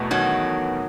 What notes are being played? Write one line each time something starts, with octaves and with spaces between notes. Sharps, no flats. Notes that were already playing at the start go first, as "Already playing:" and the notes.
Already playing: E2 B2 A3
D#3 F#3